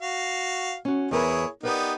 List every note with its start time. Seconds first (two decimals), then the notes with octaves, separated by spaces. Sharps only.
0.01 F#4 F5
0.85 C#4 F#4
1.11 E2 E4 G#4 A#4 B4 C#5
1.63 B3 D#4 G4 A#4 B4 D5